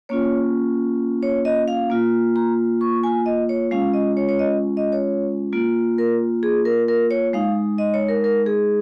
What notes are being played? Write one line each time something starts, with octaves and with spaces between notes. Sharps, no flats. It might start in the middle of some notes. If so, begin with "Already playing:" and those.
A#3 C#4 F4 C#5
C#5
D#5
F5
A#3 F4
A#5
C#6
G#5
D#5
C#5
G#3 C#4 F4 F5
D#5
C#5
C#5
D#5
D#5
C#5
A#3 F4
A#4
G#4
A#4
A#4
C#5
G#3 D#4 F5
D#5
C#5
A#4
A#4
G#4